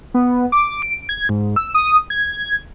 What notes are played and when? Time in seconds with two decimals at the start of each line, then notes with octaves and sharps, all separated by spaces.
0.14 B3
0.52 D6
0.82 D7
1.09 G#6
1.29 G#2
1.56 E6
1.74 D#6
2.10 G#6